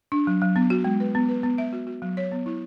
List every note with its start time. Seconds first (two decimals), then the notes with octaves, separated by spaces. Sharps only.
0.12 D4
0.27 F#3
0.42 F#3
0.56 B3
0.70 F#4
0.84 G#3
1.00 B4
1.15 B3
1.29 B4
1.43 B3
1.58 E5
1.73 F#4
1.87 F#4
2.02 F#3
2.17 C#5
2.32 B3
2.46 E4